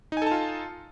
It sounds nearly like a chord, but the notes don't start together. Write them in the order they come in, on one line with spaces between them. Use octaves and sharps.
D#4 G#5 A4 A5 F4